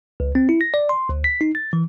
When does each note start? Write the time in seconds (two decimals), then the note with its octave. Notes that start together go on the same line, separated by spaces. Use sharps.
0.20 C#2
0.35 C4
0.49 E4
0.61 A#6
0.74 D5
0.89 C6
1.09 D2
1.24 B6
1.41 D#4
1.55 A6
1.73 E3